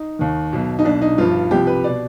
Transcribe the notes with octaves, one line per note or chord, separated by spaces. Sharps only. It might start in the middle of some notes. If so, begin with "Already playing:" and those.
Already playing: D#4
D#2 D#3
B1 B2
D#4
B1 B2 D4
D#4
G1 G2 F3 F4
C2 C3 F3 G4
B4
B2 D5